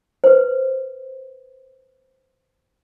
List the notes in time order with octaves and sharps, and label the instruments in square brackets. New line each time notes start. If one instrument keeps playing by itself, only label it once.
[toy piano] B4 C5